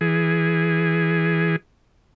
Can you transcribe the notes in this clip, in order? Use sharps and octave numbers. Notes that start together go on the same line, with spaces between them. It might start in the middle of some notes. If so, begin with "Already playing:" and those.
E3 G#4